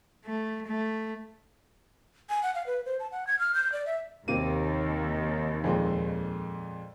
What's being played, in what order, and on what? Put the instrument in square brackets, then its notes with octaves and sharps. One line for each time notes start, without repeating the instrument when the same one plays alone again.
[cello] A3
A3
[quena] G#5
F#5
F5
B4
C5
A5
F#5
G#6
F6
G6
D5
E5
[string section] D#2 [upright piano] C3 A#3 D#7
[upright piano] F2 A#2 G#3